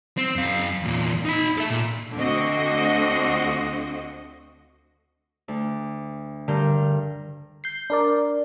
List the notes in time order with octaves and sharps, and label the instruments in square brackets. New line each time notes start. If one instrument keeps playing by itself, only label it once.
[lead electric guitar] C4
F#2 F5
E2 A#2
D#4 B5
A4 E5
A#2
[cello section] D2 D3 C4 F#4 D#5
[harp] D2
[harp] G2 A#4 G6 [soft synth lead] D3
[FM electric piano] G6 C7
D4 A#4 D5